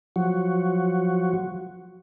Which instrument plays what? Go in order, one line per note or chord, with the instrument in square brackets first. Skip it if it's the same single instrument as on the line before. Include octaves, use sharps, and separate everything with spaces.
[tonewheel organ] F3 F#3 F#4